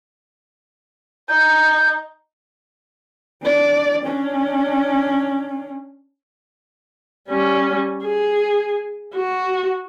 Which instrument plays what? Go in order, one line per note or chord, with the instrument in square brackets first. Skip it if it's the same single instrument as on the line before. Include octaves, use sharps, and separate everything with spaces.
[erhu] D#4 [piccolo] G6
[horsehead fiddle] D4 D5
C#4 D4
[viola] G3 C#4
G#4
F#4